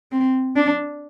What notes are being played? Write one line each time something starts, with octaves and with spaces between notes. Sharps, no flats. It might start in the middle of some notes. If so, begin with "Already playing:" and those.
C4
D4